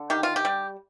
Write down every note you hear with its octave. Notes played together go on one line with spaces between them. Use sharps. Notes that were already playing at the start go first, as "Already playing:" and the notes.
Already playing: D3
D#3 G4
F4
G4
G3